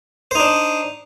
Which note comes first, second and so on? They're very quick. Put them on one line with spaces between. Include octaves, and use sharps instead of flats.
C5 D#4 D4